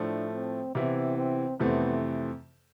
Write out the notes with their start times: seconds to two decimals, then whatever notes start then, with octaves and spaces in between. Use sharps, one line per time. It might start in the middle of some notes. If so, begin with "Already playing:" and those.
Already playing: A2 F3 A3 D4
0.33 C4
0.75 C3 E3 B3 C4 E4
1.17 C4
1.60 F2 C3 E3 A3 B3 C4